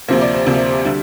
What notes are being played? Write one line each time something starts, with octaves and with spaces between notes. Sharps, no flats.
D2 C3 F3 A#3 C5
D5
C5
D2 C3 F3 A#3
D3 G3